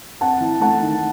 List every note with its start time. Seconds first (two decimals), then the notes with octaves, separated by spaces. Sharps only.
0.21 C4 F#5 A5
0.40 E3
0.61 A3 F#5 A5
0.82 D#3